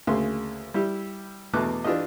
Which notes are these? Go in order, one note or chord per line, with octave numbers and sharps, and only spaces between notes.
D2 C#3 A#3 G#4 C6
G3 E4 G4
E2 B2 A3 A4 D6 F#6
E3 D4 F4 G4 D#5